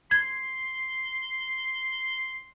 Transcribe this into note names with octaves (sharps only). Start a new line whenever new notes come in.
C6 G#6